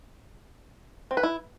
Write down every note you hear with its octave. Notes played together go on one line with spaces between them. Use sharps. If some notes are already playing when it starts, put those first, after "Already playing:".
C4
B4
E4